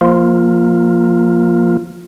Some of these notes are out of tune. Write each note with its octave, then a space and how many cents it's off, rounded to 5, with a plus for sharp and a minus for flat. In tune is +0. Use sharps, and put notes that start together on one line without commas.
F3 +0 A#3 +0 F4 +0